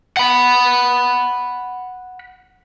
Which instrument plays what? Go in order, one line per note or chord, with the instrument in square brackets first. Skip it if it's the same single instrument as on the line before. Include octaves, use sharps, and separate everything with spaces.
[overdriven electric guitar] F#5 B5